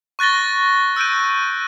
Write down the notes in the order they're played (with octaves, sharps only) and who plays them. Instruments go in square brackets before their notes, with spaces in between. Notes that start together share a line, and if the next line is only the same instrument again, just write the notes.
[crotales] C#6 F#6 A6 A#6 G7
E6 F#6 G6 D7 D#7